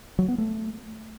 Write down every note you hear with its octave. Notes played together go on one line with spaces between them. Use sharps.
F#3
B3
A3